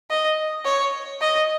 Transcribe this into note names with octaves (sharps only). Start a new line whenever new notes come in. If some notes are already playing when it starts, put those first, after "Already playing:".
D#5
C#5
D#5